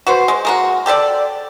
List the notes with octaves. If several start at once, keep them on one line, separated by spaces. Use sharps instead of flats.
F#4 B4 C5
G#3
G#3 A#3 F#4
G4 A4 B4 D5